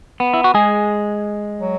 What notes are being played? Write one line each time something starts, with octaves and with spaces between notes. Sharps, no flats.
B3
E4
F#4
G#3 G#4
F#3